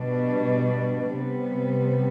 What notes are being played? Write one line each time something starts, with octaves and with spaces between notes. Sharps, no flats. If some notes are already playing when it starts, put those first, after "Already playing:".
Already playing: B2 G3 B3 D4
C3 G3 B3